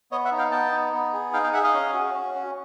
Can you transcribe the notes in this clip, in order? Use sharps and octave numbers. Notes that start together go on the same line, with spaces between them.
B3 C#5 D#5
E5 F#5
D#4
F5 G5
B3 G5 A5
D#4
B3
G#4
D#4 F5 G5
F5 G5
G#4 E5 F#5
D#5 F5
C#4
F#4
C#4
C#4